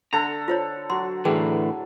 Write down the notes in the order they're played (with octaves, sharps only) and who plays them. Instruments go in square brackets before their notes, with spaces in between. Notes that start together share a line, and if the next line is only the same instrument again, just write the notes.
[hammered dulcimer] D3 A4 [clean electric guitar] A#5
[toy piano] F4 C5 C#5
[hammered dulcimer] F#3 [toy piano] C6
[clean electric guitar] A2 D3 E3 [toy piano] G#4 B4 G5